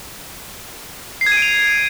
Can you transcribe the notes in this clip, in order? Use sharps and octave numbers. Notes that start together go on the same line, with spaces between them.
C7
G#6
D#7
D7
F7